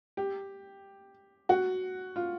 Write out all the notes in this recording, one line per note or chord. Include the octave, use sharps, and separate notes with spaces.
G4
F#4
F4